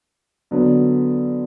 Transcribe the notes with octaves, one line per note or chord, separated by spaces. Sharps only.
D3 F#3 B3